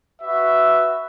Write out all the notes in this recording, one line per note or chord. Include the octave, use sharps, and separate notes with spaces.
F#4 B4 E5